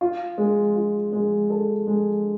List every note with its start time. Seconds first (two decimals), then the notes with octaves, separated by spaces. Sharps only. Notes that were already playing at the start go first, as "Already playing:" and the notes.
0.01 F4
0.38 G#3
0.76 F4
1.12 G#3
1.50 A4
1.87 G#3